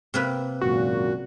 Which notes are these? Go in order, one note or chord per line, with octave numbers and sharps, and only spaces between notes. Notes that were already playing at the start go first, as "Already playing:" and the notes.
C3 A#3 B4
G#1 F#2 A#2 F#4